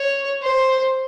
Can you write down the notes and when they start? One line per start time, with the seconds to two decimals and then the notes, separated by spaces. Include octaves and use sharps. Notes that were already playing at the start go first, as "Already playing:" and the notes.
Already playing: C#5
0.42 C5